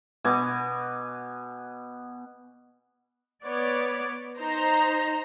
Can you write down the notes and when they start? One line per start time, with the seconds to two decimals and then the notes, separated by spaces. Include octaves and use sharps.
0.24 B2 B3 G#5 D6
3.45 B3 C#5 D5
4.39 D#4 C5 A#5